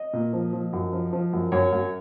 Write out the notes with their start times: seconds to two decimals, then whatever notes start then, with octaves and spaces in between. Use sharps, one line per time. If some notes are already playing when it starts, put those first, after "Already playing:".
Already playing: D#5
0.13 A#2
0.33 F3
0.53 F3
0.73 F#2
0.93 F3
1.13 F3
1.33 F#2
1.52 F#2 C#5
1.72 F#2